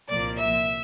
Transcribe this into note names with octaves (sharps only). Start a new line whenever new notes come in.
C2 A#2 F3 A#3 D5
E5